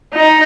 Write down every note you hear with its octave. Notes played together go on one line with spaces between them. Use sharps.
D#4